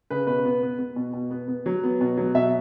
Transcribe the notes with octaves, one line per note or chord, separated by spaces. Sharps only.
C#3 B4
B2 B4
B3
B3
B3
B2
B2
B3
B3
F#3
B3
B2
F#3
B2 E5